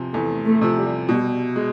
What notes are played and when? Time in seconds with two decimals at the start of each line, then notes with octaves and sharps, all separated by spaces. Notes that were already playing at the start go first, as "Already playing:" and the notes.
Already playing: E2 C3 F3
0.13 E2 A3
0.46 A3
0.61 C3 F3
0.77 G3
1.08 B2 G3
1.56 G#3